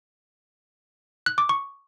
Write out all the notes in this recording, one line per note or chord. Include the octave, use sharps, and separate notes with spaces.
F#6
D6
C#6